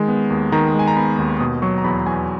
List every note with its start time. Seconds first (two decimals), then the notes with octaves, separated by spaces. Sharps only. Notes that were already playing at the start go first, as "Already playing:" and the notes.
Already playing: D#3 G#3
0.08 B3
0.30 D#2
0.52 D#3 A#5
0.74 G#3 G#5
0.88 A#5
0.97 B3 B5
1.18 D#2
1.40 B2 D#6
1.62 F#3 C#6
1.78 A#5
1.84 E2 B5
2.06 E2 G#5